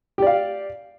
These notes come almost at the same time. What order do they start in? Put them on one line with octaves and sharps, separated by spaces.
G4 D5 F5